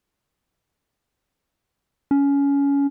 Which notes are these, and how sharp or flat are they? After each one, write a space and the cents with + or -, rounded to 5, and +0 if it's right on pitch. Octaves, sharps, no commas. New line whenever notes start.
C#4 +20